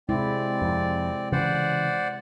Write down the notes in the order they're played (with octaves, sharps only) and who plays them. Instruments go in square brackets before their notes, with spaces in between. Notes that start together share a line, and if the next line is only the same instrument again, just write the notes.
[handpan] C3 G#3 E4 [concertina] C4 D5
[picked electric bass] F2
[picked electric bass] C#3 E3 C#4 [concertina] C5 D5 F#5